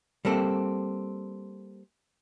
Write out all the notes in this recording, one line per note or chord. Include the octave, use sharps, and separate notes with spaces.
G3 A#3 C4 A4